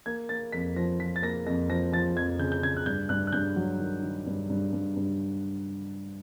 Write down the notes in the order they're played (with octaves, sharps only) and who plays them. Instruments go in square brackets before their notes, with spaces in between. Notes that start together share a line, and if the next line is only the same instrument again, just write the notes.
[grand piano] A#3 G#6
A#3 A6
F2 B6
F3 A#6
F3 B6
A6
A#3 A#6
F2 A#6
F3 A#6
F3 A6
F2 G#6
C#3 G6
G6
C#3 G#6
F#6
G2 G6
G2 F#6
F#6
G2 G6
F#3
D#3
D#3
G2
G2
G2
G2